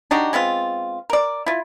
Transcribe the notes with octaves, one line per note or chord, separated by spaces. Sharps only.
D4 D#4 F#4 G4
G#3 B3 C4 F4
A#4 D5
E4 F4